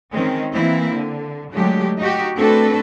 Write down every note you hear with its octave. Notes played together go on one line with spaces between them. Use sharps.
D#3 G#3 C4 C#4
E3 A#3 C4 E4
D3
D3 F#3 G#3 A3 G4
D#4 F#4 G4
A3 C4 D4 F#4 A4 B4